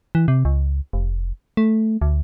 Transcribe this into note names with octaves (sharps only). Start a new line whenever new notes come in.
E3
C3
C#2
F1
A3
D2